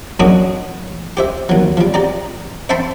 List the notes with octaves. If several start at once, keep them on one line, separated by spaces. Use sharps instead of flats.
F#2 G#3 C#4 D4 F#4 D#6
G4 C5 E5
D#2 F#3
F3 G3
G4 D5 A#5
C5 E5 G5 A5 B5 C6